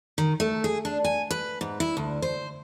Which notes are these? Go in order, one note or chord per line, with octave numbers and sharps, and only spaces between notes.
D#3
A3
G#4
D4
G#5
B4
G#2
E4
D2
C5